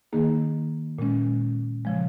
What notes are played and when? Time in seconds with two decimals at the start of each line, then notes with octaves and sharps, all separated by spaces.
0.13 D#3 A#3 D#4 G#4
0.99 A#2 G#3 C#4
1.85 C#3 F3 G#3